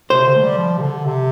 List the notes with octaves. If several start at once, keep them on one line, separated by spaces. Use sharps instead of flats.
C3 C5
D3
A3
G3
F3
C3
D3
C3